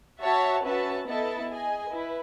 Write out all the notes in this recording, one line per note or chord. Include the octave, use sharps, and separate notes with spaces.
F#4 C#5 E5 A5
C#4 F#4 B4 E5 A5
B3 E4 A4 D#5 A5
G#4 D#5 G#5
E4 B4